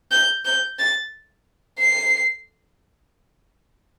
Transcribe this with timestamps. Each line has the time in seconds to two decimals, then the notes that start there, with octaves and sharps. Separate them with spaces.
0.11 G6
0.45 G6
0.79 A6
1.79 C7